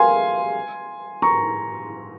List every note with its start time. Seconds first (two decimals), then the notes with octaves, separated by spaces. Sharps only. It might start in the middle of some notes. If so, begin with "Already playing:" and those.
Already playing: F5 G#5 C6
1.22 A#5 C#6